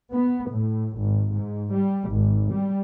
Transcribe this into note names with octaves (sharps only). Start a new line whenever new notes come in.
B3
A2
G#1
G#2
G3
G#1
G3